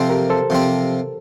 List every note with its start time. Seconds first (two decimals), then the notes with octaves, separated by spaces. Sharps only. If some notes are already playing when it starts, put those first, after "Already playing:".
Already playing: C3 F3 C4 A4 C5
0.09 G4 A#4
0.30 A4 C5
0.50 C3 F3 C4